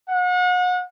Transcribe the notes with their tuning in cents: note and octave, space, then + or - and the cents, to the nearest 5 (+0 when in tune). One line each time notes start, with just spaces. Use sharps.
F#5 -35